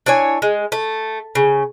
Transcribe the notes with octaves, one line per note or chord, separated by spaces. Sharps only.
D4 E4 C#5 G#5
G#3
A3
C#3